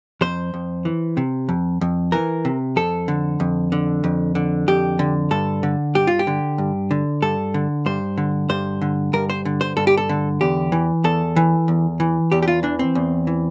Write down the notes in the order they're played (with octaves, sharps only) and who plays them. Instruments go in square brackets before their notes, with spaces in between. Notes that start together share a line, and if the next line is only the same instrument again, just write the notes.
[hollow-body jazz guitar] F2 C5
F2
E3
C3
F2
F2
E3 A#4
C3
F2 A4
D3
F2
D3
F2
D3
F2 G4
D3
G2 A4
D3
G2 G4
F4
G4
D3
G2
D3
G2 A4
D3
G2 C5
D3
G2 C5
D3
G2 A#4
C5
D3
C5
G2 A4
G4
A4
D3
E2 G4
E3
E2 A4
E3
E2
E3
E2 G4
G4
F4
E3 D4
C4
E2
E3